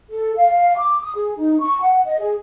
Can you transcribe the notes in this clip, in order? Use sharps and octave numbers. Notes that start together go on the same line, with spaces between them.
A4
F5
D6
D#6
G#4
D#4
C#6
F#5
D#5
G#4